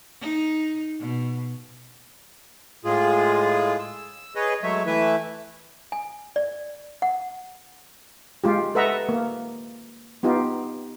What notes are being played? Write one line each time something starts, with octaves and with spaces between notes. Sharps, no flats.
D#4
B2
A2 G#3 F4 G#4
E6
G#4 B4 C#5 D#5
F#3 G#3 A3 C#5 E5
E3 A3 E4 B4 E5
G#5
D5
F#5
G#3 F4 G4
A4 B4 D#5 E5 F#5 A#5
A#3
B3 D#4 F4 G4